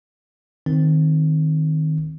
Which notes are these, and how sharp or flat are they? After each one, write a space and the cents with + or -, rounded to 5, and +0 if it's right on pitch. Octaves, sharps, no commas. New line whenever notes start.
D#3 -5 C4 +0